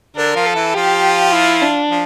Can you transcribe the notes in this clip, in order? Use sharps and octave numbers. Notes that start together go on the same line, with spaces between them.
D3 D4 A#4
F3 F4
A4
E3 E4
F3 F4 G4
E4
D4
F3